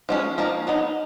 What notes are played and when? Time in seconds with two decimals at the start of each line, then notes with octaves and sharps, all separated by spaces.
0.09 F3 G#3 C#4
0.38 F3 A#3 D#4
0.67 F#3 B3 D#4